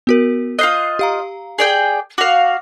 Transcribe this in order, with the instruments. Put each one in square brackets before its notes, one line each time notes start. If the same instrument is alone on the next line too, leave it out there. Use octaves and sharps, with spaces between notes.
[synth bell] B3 F#4 A#4
[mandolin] F4 C5 D#5 [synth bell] F#6 C7
[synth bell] G4 F5 A#5
[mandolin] G#4 D5 G5
[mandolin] F#4 F5 [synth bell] D6